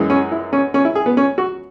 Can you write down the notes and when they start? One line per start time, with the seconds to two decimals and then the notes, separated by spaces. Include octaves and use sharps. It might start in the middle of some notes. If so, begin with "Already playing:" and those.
Already playing: F#2 E3 G#3
0.10 C#4
0.32 E4
0.53 C#4
0.74 C#4
0.85 E4
0.95 G#4
1.06 B3
1.17 C#4
1.38 F#4